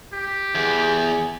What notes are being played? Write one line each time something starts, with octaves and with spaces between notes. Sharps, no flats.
G4
E2 G#4